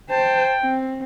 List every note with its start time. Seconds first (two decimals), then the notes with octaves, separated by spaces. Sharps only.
0.10 C5 G5 A5
0.61 C4